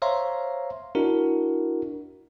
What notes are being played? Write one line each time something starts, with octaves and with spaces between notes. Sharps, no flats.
C5 C#5 E5 F5 A#5 C6
D4 E4 F#4 A#4